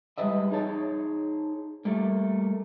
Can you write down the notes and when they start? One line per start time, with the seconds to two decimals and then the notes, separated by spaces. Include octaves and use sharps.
0.18 G3 G#3 B4 D#5 E5
0.51 D#4 G#4 C#5 A5
1.85 G3 A3 A#3